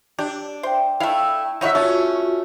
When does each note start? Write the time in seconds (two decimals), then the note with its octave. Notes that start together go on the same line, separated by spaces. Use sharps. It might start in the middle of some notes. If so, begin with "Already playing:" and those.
0.19 D4 G4
0.63 C5 E5 G5
1.00 A3 E4 F5
1.61 D#4 E4 C#5 E5 F#5
1.75 A3 C#4 F4 F#4